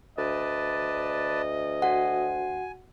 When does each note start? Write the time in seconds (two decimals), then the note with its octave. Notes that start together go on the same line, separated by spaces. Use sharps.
0.18 D2 B4 D5 D#5 A5
1.82 F#4 F#5 G#5